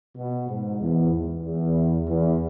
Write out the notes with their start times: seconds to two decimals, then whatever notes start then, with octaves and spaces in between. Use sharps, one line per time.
0.17 B2
0.49 G#2
0.81 E2
1.43 E2
2.07 E2